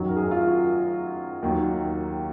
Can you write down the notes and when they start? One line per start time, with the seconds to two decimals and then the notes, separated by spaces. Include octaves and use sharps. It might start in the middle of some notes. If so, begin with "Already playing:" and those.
Already playing: F#2 D#3 F#3 F#4
0.09 A#4
0.16 G#4
0.31 F4
0.42 F#4
1.42 D#2 D#3 F#3